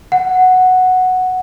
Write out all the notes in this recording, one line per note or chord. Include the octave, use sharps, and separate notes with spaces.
F#5